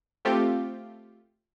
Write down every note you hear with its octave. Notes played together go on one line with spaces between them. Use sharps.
A3 C4 F4 G4